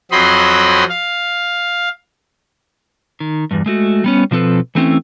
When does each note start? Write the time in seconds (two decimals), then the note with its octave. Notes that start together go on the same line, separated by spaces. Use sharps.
0.11 F2 F#3 C4 D#5 B5 C6
0.89 F5
3.20 D#3
3.51 E2 G2
3.66 G#3 A3 F#4
4.04 G3 B3 C#4
4.31 B2 F3 C4 A4 B4
4.75 E3 A3 C4 C#4 E4